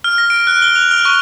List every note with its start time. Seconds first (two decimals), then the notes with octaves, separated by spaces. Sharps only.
0.04 F6
0.18 A#6
0.30 D7
0.47 F#6
0.62 G7
0.76 F7
0.91 F6
1.05 C#6